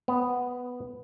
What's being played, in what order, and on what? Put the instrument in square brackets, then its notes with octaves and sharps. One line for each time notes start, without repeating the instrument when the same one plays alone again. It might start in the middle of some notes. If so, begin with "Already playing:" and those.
[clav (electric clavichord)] B3